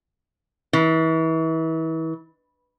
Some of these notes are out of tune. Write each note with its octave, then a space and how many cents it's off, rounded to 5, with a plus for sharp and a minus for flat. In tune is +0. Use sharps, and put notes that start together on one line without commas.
E3 -35